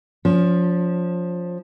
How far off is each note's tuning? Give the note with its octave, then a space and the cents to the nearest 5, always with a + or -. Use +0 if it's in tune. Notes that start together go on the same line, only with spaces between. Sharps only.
F3 +15 C#4 +40